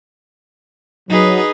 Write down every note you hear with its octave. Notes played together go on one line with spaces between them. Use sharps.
F#3 D#4 G#4 B4